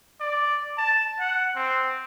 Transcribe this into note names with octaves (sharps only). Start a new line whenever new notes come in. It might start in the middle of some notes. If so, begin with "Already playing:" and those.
D5
A5
F#5
C4